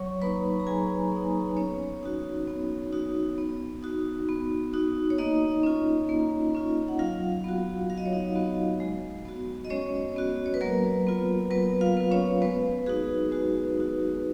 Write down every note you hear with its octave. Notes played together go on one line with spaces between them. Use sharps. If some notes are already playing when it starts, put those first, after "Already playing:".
Already playing: F#3 C#5 C#6
A#3 D#4 B4 B5
A#5
F#3 G#4 G#5
A#3 D#4
B3 C#4 C#5
D#4 F#4
B3
D#4 F#4
B3
D#4 F#4
B3
D#4 F#4
C#5
A#3 D#4 D#5
C#4 F4
A#3
C#4 F4
F#5
F#3 F4 F5
B3 F#4
F#3 F5
D#5
C#5
D#4 D#5
B3 F#4
G#3
B3 F#4
D#5
G#3 C#4 C#5
B3 F#4
C#5
B4
F#3 A#3 A#4
B3 F4
F#3 B3 B4
F4 F5
B3 F4
C#4 C#5
G#3 B3 B4
D#4 F#4 G#4
G#3 F#4
D#4 F#4